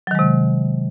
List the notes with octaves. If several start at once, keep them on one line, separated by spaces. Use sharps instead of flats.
C3 D#3 F#3 G#3